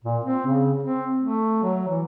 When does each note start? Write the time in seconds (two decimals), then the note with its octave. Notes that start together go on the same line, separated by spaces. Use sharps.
0.04 A#2
0.24 C4
0.47 C#3
0.83 C4
1.21 A3
1.63 F#3
1.88 E3